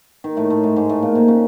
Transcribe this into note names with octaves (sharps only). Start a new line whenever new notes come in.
D#3 D#4
A2 A3
A2 A3
G#2 G#3
G#2 G#3
A2 A3
A#2 A#3
C3 C4
C#3 C#4